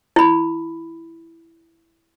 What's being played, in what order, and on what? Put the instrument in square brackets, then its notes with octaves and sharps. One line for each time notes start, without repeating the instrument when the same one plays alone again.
[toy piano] E4 B5